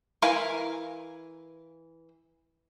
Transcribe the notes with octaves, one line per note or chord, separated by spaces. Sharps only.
E3 E4 A#4 F5 G#5